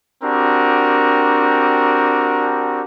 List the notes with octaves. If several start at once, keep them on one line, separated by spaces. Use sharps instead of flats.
C4 D4 F#4 G4 A#4